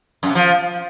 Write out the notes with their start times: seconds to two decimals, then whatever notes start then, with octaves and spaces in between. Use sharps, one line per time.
0.23 F#2
0.29 C3
0.35 F3